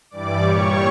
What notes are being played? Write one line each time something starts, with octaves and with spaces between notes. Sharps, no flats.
G2 E3 G3 D5 D6
A#2 G3 C#5 C#6